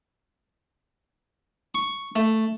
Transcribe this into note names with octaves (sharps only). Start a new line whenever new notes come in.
C#6
A3